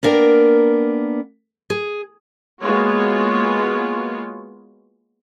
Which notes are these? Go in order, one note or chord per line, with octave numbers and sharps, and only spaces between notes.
A#3 B3 D4 A#4 G5
G#4
G#3 A#3 B3 F4 F#4 C#5